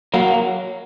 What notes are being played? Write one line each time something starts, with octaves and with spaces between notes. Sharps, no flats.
F#3 A#3